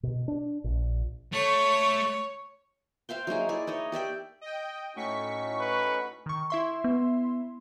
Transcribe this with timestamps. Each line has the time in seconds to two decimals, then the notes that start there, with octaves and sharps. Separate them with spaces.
0.03 B2
0.28 D4
0.64 A#1
1.33 A3 C#5
3.09 C5 E5 F5 G5
3.27 F#3 A#3 D#4 G#4
3.49 E4 D5
3.67 D#4 C#5 D#5
3.92 G4 D5 E5 G5
4.41 D#5 G5
4.96 A2 C#4 D#4 F#4 C#6 B6
5.60 B4
6.26 D#3 C#6
6.50 E4 E5 C6
6.84 B3